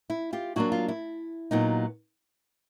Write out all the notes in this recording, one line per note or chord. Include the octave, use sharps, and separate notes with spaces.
E4
F4 G4
F#3 A#3 D4 E4 F#4
F4
E4
A#2 F#3 B3 D#4